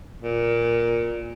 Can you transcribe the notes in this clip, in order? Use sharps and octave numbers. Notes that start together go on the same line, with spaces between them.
A#2